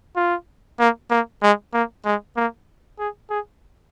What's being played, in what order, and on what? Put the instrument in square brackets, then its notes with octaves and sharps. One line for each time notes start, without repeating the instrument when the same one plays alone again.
[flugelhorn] F4
A#3
A#3
G#3
A#3
G#3
A#3
G#4
G#4